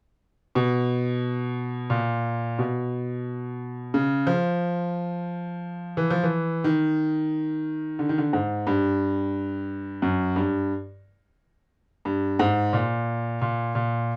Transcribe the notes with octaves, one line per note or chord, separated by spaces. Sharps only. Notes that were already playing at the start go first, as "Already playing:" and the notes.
B2
A#2
B2
C#3
F3
E3
F3
E3
D#3
D3
D#3
D3
G#2
G2
F#2
G2
G2
G#2
A#2
A#2
A#2